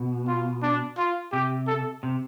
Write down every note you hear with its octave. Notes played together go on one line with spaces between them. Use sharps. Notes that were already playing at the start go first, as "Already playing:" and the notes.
Already playing: B2
F4
D4
F4
C3 G4
A4
C3